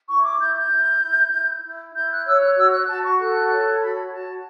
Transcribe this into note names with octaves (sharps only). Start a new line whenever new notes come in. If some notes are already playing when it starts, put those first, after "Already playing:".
E4 C#6
D6
E4 G6
G6
E4
E4
E4
E4
E4 G6
F#6
C#5 E6
F#6
F#4 E6
F#6
F#4 A5
C#6
A4 F#6
C#5
F#4 B5
F#4 A5